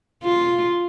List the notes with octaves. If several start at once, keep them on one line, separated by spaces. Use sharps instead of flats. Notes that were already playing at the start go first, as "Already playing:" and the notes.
F4